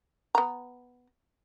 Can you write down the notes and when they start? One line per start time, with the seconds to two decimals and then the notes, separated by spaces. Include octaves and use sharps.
0.35 B3 A#5